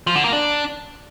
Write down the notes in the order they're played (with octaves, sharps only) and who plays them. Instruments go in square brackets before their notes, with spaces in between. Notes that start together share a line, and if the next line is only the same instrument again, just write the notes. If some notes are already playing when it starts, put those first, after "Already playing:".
[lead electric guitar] F3
D3
A#3
D4